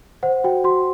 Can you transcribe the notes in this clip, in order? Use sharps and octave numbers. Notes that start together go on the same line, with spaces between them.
C5 F#5
F#4 G5
F#4 C6